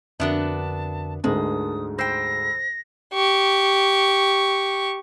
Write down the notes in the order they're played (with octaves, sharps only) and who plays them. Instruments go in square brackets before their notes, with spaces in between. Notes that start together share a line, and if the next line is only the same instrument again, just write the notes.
[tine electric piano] F2 D3 A#4 [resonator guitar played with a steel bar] B3 D4 F#4 [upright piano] E5 [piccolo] A5
[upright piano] D2 G#2 [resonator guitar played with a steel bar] G#3 [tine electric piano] A#4 A5 [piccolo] D#6
[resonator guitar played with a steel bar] C5 G5 [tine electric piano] B5 E6 C7 [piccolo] A#6
[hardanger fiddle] G4 C#6